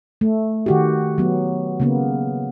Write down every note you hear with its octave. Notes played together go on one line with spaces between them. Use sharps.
A3
D#3 F#4 G4
F#3 B3
C#3 A#3 B3